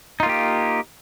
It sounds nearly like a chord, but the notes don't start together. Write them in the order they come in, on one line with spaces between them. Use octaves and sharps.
D#4 F4 A#3 G4